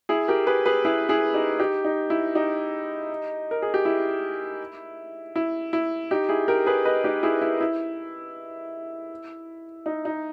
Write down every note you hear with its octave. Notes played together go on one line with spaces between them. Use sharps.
E4 G#4
G4 A#4
G#4 B4
G#4 B4
E4 G#4
E4 G#4
D#4 G4
D#4 G4
D#4
E4
D#4 G4
A#4
G#4
G4
E4
E4
E4
D#4 G4
E4 G#4
G4 A#4
G#4 B4
B4 D#5
D#4 G4
E4 G#4
E4
E4
D#4
D#4